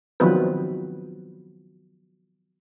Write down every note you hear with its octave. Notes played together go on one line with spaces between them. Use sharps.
D#3 F3 F#3 B3 C4 B4